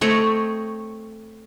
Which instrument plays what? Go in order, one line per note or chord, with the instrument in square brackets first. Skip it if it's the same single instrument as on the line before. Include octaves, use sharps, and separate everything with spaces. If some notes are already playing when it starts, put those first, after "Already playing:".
[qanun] A3 C4 C#5 D#5